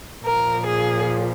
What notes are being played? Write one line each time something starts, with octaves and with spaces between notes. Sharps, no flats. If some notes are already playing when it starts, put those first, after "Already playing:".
A#2 F3 A#4
G#4